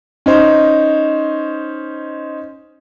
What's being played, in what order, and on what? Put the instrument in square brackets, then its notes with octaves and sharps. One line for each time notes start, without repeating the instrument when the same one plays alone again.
[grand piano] C#4 D#4 C5